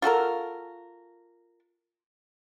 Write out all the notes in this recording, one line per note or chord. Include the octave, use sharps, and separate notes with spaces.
F4 F#4 A4 A#4